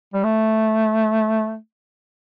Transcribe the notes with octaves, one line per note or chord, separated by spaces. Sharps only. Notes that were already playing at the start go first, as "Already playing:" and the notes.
G3
A3